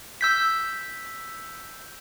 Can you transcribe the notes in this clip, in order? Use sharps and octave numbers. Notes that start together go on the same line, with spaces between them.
E6 G6 B6